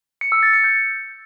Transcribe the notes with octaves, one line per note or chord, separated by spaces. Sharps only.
C#7
E6
A6
C#7
G6